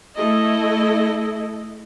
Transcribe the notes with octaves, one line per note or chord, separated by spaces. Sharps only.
A3 E4 A4 D#5